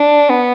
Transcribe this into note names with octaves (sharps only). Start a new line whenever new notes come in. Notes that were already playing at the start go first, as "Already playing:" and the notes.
Already playing: D4
B3